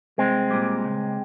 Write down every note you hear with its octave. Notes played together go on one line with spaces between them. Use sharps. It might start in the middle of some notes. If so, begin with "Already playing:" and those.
C2 G#3 C4
A#2 G3
C#2